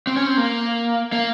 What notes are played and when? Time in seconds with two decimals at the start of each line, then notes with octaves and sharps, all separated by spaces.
0.07 C4
0.17 C#4
0.27 C4
0.37 A#3
1.12 A#3